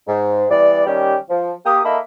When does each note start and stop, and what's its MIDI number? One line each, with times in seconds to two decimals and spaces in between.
0.07 0.45 44
0.50 0.85 52
0.50 0.85 55
0.50 0.85 59
0.50 0.85 74
0.86 1.15 51
0.86 1.15 55
0.86 1.15 61
0.86 1.15 67
1.30 1.52 53
1.65 1.79 58
1.65 1.79 67
1.65 1.79 87
1.85 1.97 58
1.85 1.97 63
1.85 1.97 69
1.85 1.97 75
1.85 1.97 76
1.85 1.97 83